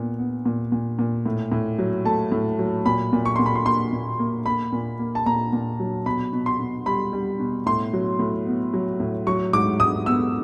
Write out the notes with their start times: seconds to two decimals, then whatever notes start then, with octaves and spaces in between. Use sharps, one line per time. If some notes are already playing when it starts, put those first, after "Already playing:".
Already playing: A#2 B3
0.18 B3
0.45 A#2
0.72 A#2
0.99 A#2
1.26 A2
1.52 A2
1.79 F#3
2.05 A3 A5
2.32 A2
2.59 F#3
2.85 A#2 B5
3.13 A#2
3.25 C#6
3.36 A#2 C6
3.46 B5
3.55 C6
3.66 A#3 C6
3.92 A#2
4.19 A#3
4.46 A#3 B5
4.72 A#2
4.99 A#3
5.15 A5
5.26 A#2 A#5
5.53 A#2
5.79 F#3
6.06 B2 B5
6.33 B2
6.46 C6
6.59 B2
6.86 G3 B5
7.13 G3
7.40 B2
7.66 A2 C6
7.93 F#3
8.19 A2
8.46 B3
8.73 F#3
9.00 A2
9.27 F#3 C#6
9.53 G#2 D6
9.80 G#2 D#6
10.06 B3 E6